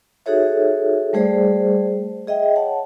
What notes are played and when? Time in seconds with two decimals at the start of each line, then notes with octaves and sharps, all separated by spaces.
0.26 D#4 F#4 G#4 A4 C#5 E5
1.13 G3 A3 G#4 C5 D5
2.27 G#4 D#5 E5 G5
2.56 C#5 F#5 A5